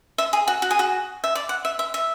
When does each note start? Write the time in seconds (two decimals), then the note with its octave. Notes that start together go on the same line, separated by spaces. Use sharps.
0.18 E5
0.33 G#4
0.48 F#4
0.62 F#4
0.71 G#4
0.79 F#4
1.24 E5
1.35 D5
1.49 F#5
1.65 E5
1.79 E5
1.94 E5